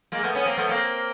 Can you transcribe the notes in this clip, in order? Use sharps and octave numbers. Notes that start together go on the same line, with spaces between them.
G#3 A#3
A3 B3
B3 C#4
A#3 C4
A3 B3
A#3 C4